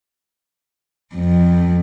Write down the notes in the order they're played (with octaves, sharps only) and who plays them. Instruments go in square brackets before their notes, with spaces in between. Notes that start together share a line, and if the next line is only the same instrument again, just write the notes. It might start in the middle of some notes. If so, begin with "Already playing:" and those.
[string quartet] F2